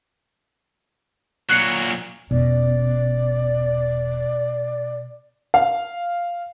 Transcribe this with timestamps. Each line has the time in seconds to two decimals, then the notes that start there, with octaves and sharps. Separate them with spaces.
1.49 A#2 F#3 F#6 C7 C#7
2.31 E1 B2 C#4 D5
5.54 F5